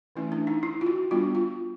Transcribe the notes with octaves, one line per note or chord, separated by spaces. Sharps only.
E3 A3 C#4 E4
D4
D#4
E4
F4
F#4
G3 B3 D4 F4
F4